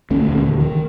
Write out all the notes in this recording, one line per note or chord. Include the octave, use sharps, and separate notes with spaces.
D2 A3 C#4
D#1 D2
D#3